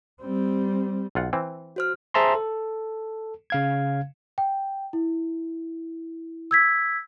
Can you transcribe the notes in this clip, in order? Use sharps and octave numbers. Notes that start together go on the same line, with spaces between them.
G3 C4
B1 F4 F#5
E3 C4
F#4 C5 F6
G#4 C5 E5 A5 A#5 C6
A4
C#3 F5 G#6
G5
E4
E6 G#6 B6